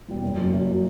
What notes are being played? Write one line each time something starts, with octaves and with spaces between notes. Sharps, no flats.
E2 B2 G3 B3
F#1
F#2 F#3
F#1
F#3